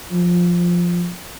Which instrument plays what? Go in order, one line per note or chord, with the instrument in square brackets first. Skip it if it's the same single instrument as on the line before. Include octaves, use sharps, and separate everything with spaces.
[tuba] F3